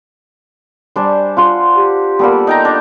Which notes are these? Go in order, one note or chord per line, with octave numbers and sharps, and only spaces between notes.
G3 D4 C5 G#5
F4 F#5 C6
G4
G3 A#3 B3 A4 D5
D#4 G5 A#5
D4